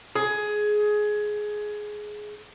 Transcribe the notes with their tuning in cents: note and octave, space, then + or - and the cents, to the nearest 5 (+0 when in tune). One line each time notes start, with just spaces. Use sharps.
G#4 +15